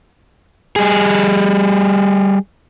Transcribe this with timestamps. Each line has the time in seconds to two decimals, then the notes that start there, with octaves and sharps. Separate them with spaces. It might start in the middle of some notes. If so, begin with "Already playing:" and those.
0.76 G3 G#4